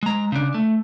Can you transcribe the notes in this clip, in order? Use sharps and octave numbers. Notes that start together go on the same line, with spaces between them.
G#3 A#5
C#3 D4
A3